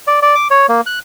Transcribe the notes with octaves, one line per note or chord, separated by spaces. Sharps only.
D5
D5
D6
C#5
A#3
F#6